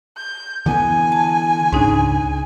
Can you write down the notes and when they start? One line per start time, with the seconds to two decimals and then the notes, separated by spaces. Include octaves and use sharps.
0.17 G6
0.66 D3 E3 B3 G#5
1.12 A5
1.72 C#2 G#2 C#3 D4 D#4